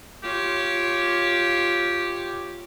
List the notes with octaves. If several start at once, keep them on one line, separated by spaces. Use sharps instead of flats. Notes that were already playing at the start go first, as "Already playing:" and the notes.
F4 G4 C#5